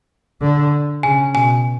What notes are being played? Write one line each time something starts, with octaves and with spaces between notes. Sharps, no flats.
D3
C#3 G#5
B2 G#5